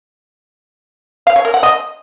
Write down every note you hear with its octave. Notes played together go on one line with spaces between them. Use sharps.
F5
C#5
A#4
F#5
D#5